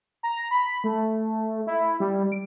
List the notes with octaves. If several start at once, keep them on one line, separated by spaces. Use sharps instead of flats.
A#5
B5
A3
E4
G3
D7